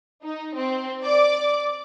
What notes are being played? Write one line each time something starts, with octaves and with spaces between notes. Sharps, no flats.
D#4
C4
D5 D6